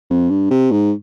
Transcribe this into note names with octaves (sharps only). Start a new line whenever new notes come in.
F2
G2
C3
G#2